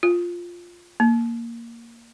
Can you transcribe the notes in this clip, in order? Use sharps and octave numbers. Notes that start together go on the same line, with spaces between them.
F4
A#3